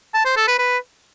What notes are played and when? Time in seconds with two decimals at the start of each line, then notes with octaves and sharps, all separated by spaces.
0.14 A5
0.25 C5
0.37 A4
0.48 B4
0.59 B4